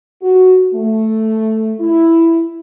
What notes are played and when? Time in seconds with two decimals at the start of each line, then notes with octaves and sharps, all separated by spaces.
0.23 F#4
0.74 A3
1.80 E4